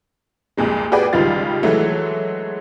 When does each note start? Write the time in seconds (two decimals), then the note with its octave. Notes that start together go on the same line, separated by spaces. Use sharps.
0.57 C2 F2 A#2 G#3
0.92 F#4 G#4 B4 D5 G5
1.13 C#2 D#3 G3 F4 A6
1.63 E3 F#3 G#3 A3